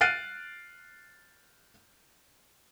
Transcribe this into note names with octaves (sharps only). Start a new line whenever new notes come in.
F6 F#6 A6 C7 D7 D#7